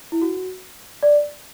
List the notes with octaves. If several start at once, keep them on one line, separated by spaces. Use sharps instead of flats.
E4
F#4
D5